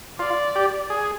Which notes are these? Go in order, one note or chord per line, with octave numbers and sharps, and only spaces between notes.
F4 D5
G4
G#4